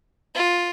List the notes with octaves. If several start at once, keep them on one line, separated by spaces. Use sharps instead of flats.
F4